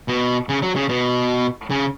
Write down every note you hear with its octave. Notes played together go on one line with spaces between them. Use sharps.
B2
C#3
F#3
C#3
B2
C#3